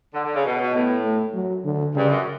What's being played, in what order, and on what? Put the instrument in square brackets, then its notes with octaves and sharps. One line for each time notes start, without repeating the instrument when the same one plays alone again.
[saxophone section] D3
D3
C#3
B2
B2
[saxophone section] A2 [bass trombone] B3
[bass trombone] A3
F#3
D3
[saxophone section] G2 [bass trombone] C#3
[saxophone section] F#2